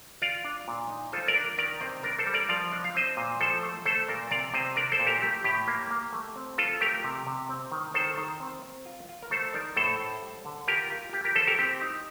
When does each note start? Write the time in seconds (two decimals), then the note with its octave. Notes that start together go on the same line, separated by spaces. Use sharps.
0.22 F4 D5 F5
0.44 D4
0.68 A#2
0.90 D#4
1.13 F4 A4 C5
1.28 A#4 D5
1.35 D4
1.58 D#3 A#4 D5
1.81 C3 C5 D#5
2.03 D4 A#4 D5
2.19 A4 C5
2.27 G3
2.34 A#4 D5
2.49 F3 D5 F5
2.72 D4 D#5
2.84 F5
2.95 C4 C5 D#5
3.17 A#2
3.40 F3 A4 C5
3.63 A3
3.86 A3 A4 C5
4.08 A#2 A#4 D5
4.31 C3 D5 F5
4.54 C3 C5 D#5
4.76 D4 A#4 D5
4.92 A4 C5
4.99 A#2
5.07 G4 A#4
5.22 A3 G4
5.44 A2 G4
5.68 A#3
5.91 A#3
6.13 A3
6.36 C4
6.58 F4 A4
6.81 A3 G4 A#4
7.04 C3
7.27 C3
7.49 C4
7.72 D#3
7.94 D#3 A4 C5
8.17 D#3
8.40 C4
8.62 C4
8.86 F4
9.09 F4
9.22 A#4
9.31 A3 A4 C5
9.54 D#4 A#4 D5
9.76 A2 A4 C5
10.00 A2
10.22 G3
10.45 D3
10.68 F4 G4 A#4
10.90 F4
11.13 F4 G4
11.24 G4 A#4
11.35 F4 A4 C5
11.47 G4 A#4
11.59 C4 G4
11.81 D#4